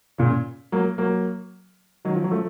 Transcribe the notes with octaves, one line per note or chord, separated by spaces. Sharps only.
A#2 C#3
F#3 A#3
F#3 A#3
D#3 F#3
F3
F#3
F3 A3